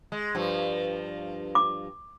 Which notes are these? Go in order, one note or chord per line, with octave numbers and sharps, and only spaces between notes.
G#3
G2 F3
D6